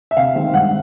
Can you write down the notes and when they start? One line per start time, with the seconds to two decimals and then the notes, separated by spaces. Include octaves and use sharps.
0.11 E5
0.17 C3 F5
0.35 D#3 G#3 C4
0.54 G2 F#5